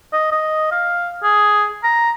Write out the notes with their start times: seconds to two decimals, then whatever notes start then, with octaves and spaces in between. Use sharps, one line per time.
0.13 D#5
0.32 D#5
0.72 F5
1.23 G#4
1.84 A#5